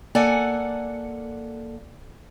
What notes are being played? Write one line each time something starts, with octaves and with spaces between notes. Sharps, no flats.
A#3 A4 D5 F#5 G#5